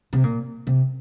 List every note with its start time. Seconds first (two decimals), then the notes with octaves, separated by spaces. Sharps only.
0.13 C3
0.24 A#2
0.67 C3